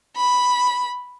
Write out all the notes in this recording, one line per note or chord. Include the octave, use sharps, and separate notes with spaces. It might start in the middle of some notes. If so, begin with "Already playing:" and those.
B5